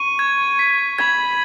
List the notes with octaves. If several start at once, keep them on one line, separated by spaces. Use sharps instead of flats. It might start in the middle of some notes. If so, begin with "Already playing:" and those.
Already playing: C#6 D#7
G#6
B6
B5 G#6